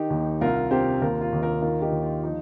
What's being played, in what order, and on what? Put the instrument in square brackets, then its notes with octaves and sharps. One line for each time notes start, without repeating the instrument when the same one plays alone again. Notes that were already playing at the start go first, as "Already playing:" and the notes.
Already playing: [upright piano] D#3 D#4 G4
D#2
C2 F4 A#4
C3 G4 C5
D#2 F4 A#4
F4
D#2
F4 A#4
D#3 F4 A#4
D#4 G4
D#2
F4
F3 D#4